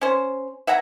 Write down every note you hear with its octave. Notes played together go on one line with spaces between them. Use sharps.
C#4 C5
E5 F#5 G#5 A#5